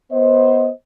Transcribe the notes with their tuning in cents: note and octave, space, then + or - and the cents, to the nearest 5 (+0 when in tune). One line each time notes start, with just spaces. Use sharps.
B3 +0 C5 +15 D#5 +25